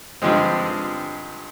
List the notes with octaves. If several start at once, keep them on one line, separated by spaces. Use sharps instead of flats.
G2 D3 F3 G#3 C4